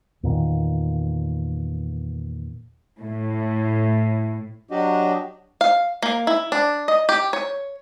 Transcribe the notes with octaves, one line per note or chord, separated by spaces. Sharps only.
E2 A#2 D#3
A2
F#3 D4 F#4 G4 D#5
F5
A#3
E4
D4
D#5
G4
C#5